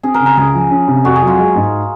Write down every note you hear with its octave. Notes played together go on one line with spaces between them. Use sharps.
C4 G#4
A#4
C#3
A#4
C#2 G#4
F3
C#4
C3
F2 F#4
G#4
F#3
F4
G#3
G#2